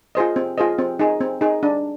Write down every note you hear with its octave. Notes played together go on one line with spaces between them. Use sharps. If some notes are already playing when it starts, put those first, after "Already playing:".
F4 G#4 C5 D#5
C4
F4 G#4 C5 D#5
C4
D#4 G#4
C4
D#4 G#4
D4